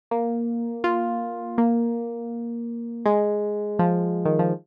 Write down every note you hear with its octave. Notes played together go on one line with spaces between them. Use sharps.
A#3
F4
A#3
G#3
F3
D#3
F3